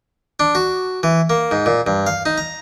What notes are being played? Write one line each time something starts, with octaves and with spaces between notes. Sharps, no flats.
D4
F#4
E3
A#3
G#2
A#2
G2
F5
D#4
A#5